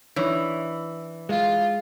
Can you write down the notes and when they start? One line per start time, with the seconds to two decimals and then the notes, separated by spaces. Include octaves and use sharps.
0.16 E3 D4 D#4 C#5
1.29 G#3 F4